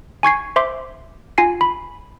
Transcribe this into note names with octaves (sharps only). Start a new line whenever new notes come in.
G#5 C#6 G#6 C7
C5 E5 C6 D6
F4 G#5 C7
B5